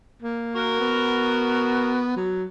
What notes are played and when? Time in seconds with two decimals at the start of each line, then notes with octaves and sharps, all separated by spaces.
0.22 A#3
0.55 F#4 A#4
0.81 B3
2.17 F#3